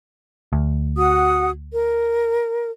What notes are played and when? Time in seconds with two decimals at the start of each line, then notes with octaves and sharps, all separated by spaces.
0.53 D2
0.97 F#4 F#5 D#6
1.73 A#4